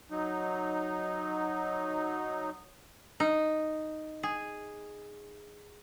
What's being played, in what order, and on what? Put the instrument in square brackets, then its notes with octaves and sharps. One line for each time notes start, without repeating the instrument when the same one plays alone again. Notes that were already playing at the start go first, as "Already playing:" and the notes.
[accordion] F#3 D#4
[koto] D#4
G#4